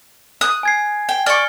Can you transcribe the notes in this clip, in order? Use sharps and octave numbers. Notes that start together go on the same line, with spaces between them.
D#6 F#6
G#5 G#6 C7
G5
D5 C#6 F6 G7